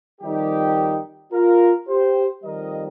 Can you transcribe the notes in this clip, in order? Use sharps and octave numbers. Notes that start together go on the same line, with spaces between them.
F2 D#3 G3 D#4 G4
F4 A#4
G4 C5
F2 D#3 G3 A#4 D#5